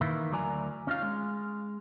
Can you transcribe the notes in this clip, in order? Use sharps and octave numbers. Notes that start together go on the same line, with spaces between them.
D#3 E3 A#3 E4
D2 F#3 A#4 D5 G#5 A#5
C#4 D#4 F4 F5
G#3